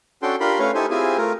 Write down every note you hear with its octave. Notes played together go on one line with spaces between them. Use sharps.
C#4 D4 F#4 A4 G5 C6
D4 F4 G4 A#4 B5 C6
A3 C#4 B4 C#5 F5
D#4 E4 G4 A4 C5 G#5
C4 E4 F4 G4 G#4 G#5
A3 F4 A#4